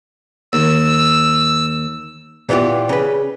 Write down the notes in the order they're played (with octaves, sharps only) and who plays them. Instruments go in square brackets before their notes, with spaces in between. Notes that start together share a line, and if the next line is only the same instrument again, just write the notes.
[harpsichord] D#2 [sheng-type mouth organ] E6
[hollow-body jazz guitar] A#2 E3 B3 F4 G4
C#3 B4